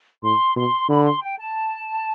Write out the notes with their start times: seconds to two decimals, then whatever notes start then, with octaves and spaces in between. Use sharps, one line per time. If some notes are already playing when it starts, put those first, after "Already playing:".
0.23 A2 C6
0.56 B2 C6
0.89 D3 B5
1.06 C6
1.21 G5
1.38 A5